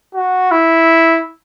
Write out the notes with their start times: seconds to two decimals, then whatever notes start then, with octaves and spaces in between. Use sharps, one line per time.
0.15 F#4
0.51 E4